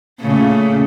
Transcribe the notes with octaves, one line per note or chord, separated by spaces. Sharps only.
A#2 C#3 A3